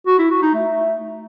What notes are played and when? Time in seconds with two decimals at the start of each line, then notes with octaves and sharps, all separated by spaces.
0.07 F#4
0.19 E4
0.30 F#4
0.42 D#4
0.54 A3